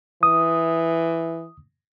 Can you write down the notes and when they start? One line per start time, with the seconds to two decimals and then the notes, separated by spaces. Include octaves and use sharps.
0.23 E3 D#6